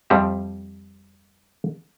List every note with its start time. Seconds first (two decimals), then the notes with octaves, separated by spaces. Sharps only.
0.10 F2 F3 G3 C4 E5